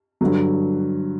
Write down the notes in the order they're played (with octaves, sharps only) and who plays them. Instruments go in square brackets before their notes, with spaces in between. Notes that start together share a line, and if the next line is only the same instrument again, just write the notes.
[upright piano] G2 D3 F#3